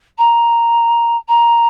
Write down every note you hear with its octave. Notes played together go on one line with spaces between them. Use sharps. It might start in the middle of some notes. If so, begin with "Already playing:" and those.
A#5
A#5